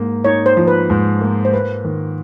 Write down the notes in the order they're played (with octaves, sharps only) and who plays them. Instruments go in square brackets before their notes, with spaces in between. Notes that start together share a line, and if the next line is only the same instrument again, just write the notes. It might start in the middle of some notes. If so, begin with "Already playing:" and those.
Already playing: [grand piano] G#2 A#3 D#4
[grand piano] D#4 [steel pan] C#5
[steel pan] C5
[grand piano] F3
[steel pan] B4
[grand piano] G#2
A#3
[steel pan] C5
[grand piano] A#3 [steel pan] B4
[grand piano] D#3